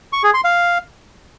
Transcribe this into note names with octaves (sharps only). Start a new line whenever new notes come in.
C#6
G#4
C6
F5